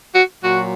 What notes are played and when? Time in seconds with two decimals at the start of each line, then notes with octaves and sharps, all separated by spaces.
0.13 F#4
0.42 A#2 F#3 F#4